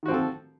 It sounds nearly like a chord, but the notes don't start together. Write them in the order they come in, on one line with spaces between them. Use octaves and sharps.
D#3 F#4 C4 F3 A4